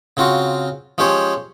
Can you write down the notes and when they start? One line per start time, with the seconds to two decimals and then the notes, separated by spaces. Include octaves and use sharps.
0.17 C#3 C4 F4 F#4
0.98 F3 G#3 C#4 G4 C5 C#5